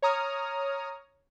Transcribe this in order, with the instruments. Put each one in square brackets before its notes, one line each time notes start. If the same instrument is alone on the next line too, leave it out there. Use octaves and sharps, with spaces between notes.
[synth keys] C#5 A#5 D#6 F6